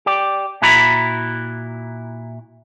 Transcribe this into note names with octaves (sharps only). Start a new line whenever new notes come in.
G4 D5
A#2 E4 F#4 A#5 B5